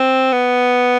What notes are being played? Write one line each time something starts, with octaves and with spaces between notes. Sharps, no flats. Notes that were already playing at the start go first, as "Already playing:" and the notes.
Already playing: C4
B3